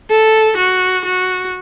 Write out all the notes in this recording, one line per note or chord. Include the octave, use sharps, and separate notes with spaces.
A4
F#4
F#4